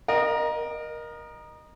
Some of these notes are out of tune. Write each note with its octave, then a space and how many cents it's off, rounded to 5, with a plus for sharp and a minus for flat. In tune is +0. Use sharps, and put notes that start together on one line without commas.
A#4 +20 D#5 -20